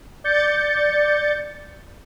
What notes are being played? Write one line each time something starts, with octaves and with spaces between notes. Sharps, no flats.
D5 G6 A6 C#7